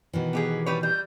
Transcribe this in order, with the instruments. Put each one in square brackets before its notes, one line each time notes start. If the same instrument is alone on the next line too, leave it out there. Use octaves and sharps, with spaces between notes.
[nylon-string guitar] B2 D#3 E3
[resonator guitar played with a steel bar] B3 G4 G#4
G3 B4 C#5
[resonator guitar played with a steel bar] G3 [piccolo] G6